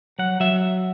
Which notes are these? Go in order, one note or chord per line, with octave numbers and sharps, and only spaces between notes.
F#3 F#5
F#3 E5